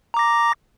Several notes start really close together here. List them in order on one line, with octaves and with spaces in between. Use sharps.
A#5 D6 A#6